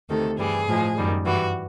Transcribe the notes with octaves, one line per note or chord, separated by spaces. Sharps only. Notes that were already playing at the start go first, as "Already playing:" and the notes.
D2 C3 D#3 A4
G2 E3 G3 G#4
A2 F3 G#3
F#2 D#3 G3
G2 E3 G3 F#4